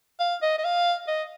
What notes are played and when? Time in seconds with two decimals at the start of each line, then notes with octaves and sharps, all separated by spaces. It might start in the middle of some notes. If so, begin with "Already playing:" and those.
0.20 F5
0.42 D#5
0.58 D#5
0.64 F5
1.08 D#5